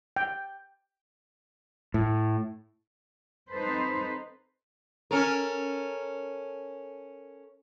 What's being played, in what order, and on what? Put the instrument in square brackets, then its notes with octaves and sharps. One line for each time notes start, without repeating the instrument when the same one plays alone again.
[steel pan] G5
[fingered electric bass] A2
[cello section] C4 D#4 A4 B4 C5
[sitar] C#4 A4 A#4